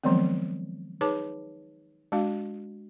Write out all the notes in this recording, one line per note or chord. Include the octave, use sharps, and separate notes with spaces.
D#3 F3 F#3 G#3 B3 C4
D#4 G#4 B4 C#5 A5 D6
G#3 D4 F#4 F5